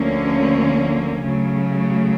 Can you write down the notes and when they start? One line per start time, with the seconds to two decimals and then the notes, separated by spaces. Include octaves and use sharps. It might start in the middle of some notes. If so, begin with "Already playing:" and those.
Already playing: D2 D3 F3 A#3 C#4
1.22 C#3 F#3 A3